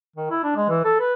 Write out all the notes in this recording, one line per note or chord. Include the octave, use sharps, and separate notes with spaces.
D#3
E4
D4
G#3
E3
A4
B4